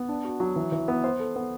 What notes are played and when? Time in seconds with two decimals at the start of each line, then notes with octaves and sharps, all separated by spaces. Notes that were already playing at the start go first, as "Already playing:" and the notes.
Already playing: B3
0.09 D4
0.25 F#4
0.40 F#3
0.56 E3
0.72 E3
0.88 B3
1.04 C5
1.20 A4
1.36 B3